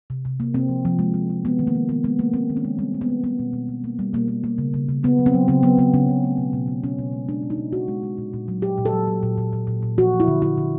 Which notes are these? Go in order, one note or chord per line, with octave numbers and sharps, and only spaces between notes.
C3
C3
A#3
C3 C4
F3
F3
G#3
G#3
G#3
G#3 B3
D#3
A#3
G#3
D#3 B3
G#3 B3
G#3 A#3
G#3 C4
D#3
C#4
G#3
G3 C4
A#3
B3
A#3
G3 B3
B2
B2
B2
A#3
G3
B2 A#3
A#3
A#3
C#3
C#3
C#3
C#3 B3
F#3
C4
F#3
C#3 C4
F#3 B3
C#3 B3
C#3 C#4
C#3
A3
B2
B2
B2
B2 C#4
B2
G#3
G#3 D4
B2
D#4
B2
B2 F#4
G#3
G#3
A#2
A#2
F#3
A#2 G4
A#2
A4
F#3
F#3
A#2
A#2
A#2
A#2
A#2
F3 F#4
F3
E4
D3
D3 E4
D3